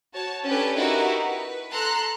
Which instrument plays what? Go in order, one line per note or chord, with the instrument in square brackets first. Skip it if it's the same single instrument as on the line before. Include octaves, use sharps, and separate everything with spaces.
[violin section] F#4 C#5 A5
C#4 D4 G4 A4 B4
D#4 E4 F#4 G4 A#4 B4
B4
A4 A#5 C6 F#6